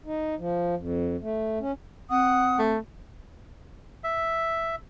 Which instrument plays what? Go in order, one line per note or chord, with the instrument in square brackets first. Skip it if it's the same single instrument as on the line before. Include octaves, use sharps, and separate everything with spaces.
[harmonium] D#4
F3
F2
A3
C#4
[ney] C4 [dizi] F#5 [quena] D#6
[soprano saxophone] A3
[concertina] E5